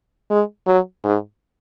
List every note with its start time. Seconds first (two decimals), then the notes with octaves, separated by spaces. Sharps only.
0.30 G#3
0.67 F#3
1.04 G#2